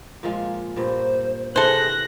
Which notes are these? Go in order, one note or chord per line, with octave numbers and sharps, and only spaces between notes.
A#2 F3 G#3
G2 A#2 C5
C3 E3 G#4 A4 C5 F#6 A#6